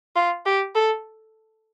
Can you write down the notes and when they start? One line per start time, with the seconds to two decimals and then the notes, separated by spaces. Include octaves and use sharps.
0.16 F4
0.46 G4
0.75 A4